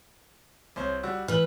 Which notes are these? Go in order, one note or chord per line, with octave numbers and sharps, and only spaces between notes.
C2 C5 C#5
G3 F#4 E6
E3 B4 F6 F#7